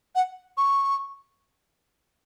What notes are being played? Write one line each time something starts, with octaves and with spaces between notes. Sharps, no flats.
F#5
C#6